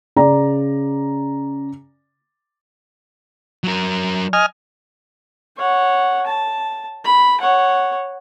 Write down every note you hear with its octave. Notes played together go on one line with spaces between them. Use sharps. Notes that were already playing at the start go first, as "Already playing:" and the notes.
C#3 D5 A#5
F#3 A#4
D#5 G#5 F6
C#5 F#5
A5
B5
C#5 F#5